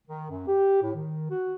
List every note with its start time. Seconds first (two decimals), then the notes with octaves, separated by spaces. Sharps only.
0.07 D#3
0.31 F#2
0.48 G4
0.82 A2
0.95 D#3
1.30 F#4